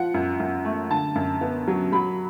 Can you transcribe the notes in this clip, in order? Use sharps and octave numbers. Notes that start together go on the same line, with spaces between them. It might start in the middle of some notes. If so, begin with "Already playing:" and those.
Already playing: F3 F#5
F#2
F#2
A3
D3 A5
F#2
B3
F#3
F#3 B5